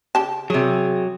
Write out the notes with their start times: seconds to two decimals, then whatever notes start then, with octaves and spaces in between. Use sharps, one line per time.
0.15 C#3 G4 A5
0.50 C3 F#3 G#4